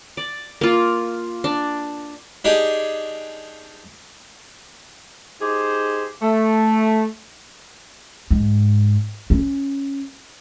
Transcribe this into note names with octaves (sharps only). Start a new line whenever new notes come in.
D5
A#3 F4
D4
D4 D#4 G4 G#4
D#4 G4 G#4 C5
A3
G#2
C#4